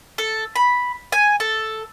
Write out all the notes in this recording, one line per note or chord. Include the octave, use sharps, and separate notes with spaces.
A4
B5
G#5
A4